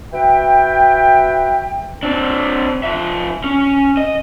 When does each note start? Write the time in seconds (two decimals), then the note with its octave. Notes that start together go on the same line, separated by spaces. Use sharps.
0.13 F#4 B4 E5 G5
2.03 C4 D4
2.83 F3 E5
3.44 C#4
3.97 D#5